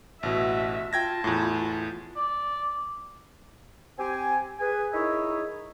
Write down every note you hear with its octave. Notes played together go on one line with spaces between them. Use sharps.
A1 B2 F#4 E5
F4 G5 A5 G#6 A#6
E2 A2
D5
C4 G4 C5 G#5
G#4 B4 G#5
D#4 E4 G#4 A#4 C#5 E5